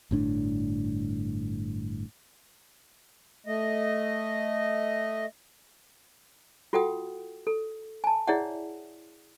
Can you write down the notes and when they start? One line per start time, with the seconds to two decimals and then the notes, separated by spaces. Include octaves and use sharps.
0.11 G1 A2 D4
3.46 A3 D#5
6.73 F4 F#4 A4 F#5 G5 D#6
7.47 A4
8.04 G#5 A5
8.28 E4 G#4 C#5 D5 E5 F#5